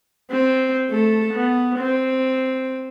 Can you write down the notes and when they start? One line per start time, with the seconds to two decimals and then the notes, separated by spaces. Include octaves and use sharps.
0.30 C4
0.89 A3 A4
1.33 B3
1.79 C4